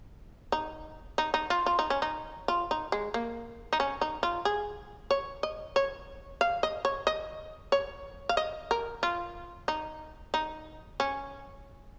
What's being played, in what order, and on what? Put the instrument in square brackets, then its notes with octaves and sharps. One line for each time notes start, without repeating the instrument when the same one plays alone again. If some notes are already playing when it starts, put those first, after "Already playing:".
[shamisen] D#4
D#4
D#4
F4
F4
D#4
C#4
D#4
F4
D#4
G#3
A#3
D#4
C#4
D#4
F4
G#4
C#5
D#5
C#5
F5
D#5
C#5
D#5
C#5
F5
D#5
A#4
F4
D#4
D#4
C#4